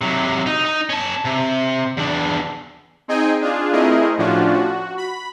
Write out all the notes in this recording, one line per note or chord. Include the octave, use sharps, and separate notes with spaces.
C3 F#3
D#4
D#4
C#4 A5
C3
E2 D4
C4 D#4 G#4 D#5 G5 G#5
D4 F4 G#4
A3 C4 E4 G#4 A#4 D#5
A2 F3 C#4 D4 F4 F#4
F#4
B5